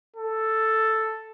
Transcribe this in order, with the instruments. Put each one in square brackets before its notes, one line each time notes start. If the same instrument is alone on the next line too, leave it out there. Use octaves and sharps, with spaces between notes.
[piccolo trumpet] A4